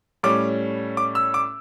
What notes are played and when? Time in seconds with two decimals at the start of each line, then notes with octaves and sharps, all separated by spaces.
0.23 A2 G3 C#4 D6
0.97 D6
1.15 E6
1.34 D6